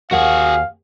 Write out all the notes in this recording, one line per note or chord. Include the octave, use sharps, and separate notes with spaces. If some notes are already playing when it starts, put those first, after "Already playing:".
D#2 F#4 G#4 F5 F#5